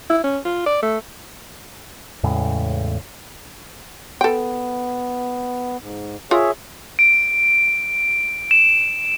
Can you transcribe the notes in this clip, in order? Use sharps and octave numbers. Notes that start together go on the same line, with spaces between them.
E4
C#4
F4
D5
A3
E2 A2 C#3 G#3
B3 A4 G5
G#2
F4 G#4 A#4 C#5 E5
D7
E7